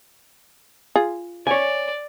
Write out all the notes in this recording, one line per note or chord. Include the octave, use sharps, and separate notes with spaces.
F4 G#4
C#5 D5 G#5